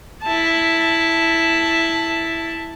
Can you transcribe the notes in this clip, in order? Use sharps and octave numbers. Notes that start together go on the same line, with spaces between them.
E4 A5